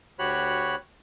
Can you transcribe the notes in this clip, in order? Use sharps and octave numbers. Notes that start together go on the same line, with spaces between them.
D2 F#4 G4 C#5 B5 F#6